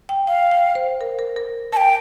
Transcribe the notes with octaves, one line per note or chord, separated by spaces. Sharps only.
G5
F5 G5
G5
C5
A#4
A#4
A#4
A#4 A5
G5